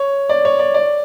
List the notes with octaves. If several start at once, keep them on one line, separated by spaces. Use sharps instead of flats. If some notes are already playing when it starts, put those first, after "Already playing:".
Already playing: C#5
D5
C#5
D5
D5